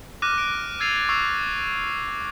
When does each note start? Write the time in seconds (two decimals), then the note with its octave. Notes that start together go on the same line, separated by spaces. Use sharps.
0.22 D6 F6 F#6 A#6 D#7
0.38 D7
0.80 E6 G#6 A6 C7 D#7 F7
1.09 C#6 E6 A6 C7 F7